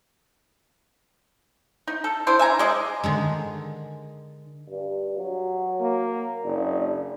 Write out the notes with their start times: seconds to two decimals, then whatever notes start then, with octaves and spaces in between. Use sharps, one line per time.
1.87 D#4
2.04 A4
2.27 D4 E4 C5
2.39 E5 G#5 A#5
2.59 G#3 D5 D#5
3.03 D3 D#3 G#3
4.70 G2
5.17 F#3
5.81 A#3
6.44 F#1 D4